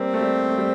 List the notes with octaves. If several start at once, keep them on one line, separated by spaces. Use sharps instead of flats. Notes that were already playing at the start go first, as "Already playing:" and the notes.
Already playing: G3 A#3 C4
A3
G3
A3
G3